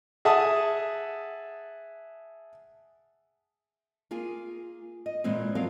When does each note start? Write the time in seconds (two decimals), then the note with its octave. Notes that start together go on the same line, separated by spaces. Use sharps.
0.25 G#4 E5 F#5 A5 D#6
4.11 A#3 F4 G#4
5.06 D#5
5.24 A#2 E3 G#3 A#3 C4
5.55 G2 F3 F#3 F4 A#4 F5